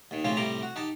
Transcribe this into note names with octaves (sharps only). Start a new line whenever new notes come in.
D#2 D#3
A2 C#3 C4 F4 G4 C#5
A2 C3 G3 G4 A#5 D6
F#4
D#4 G4 A5